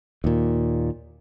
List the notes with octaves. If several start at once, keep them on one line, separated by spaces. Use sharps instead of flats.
D#2 A#2